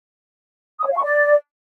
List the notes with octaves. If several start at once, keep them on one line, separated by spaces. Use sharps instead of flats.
D#6
C#5
F5
C#6
D5